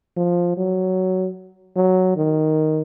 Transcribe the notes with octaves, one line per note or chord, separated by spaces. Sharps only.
F3
F#3
F#3
D#3